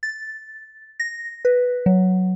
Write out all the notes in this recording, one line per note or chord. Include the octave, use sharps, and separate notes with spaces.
A6
A#6
B4
F#3